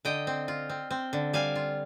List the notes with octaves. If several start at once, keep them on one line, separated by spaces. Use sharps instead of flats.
D3 D#5 G5
C4
F4
C4
C4
D3
G3 F5 G#5
F4